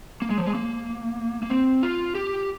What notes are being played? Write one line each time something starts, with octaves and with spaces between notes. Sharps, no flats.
A#3
G#3
F3
G#3
A#3
A#3
C4
F4
G4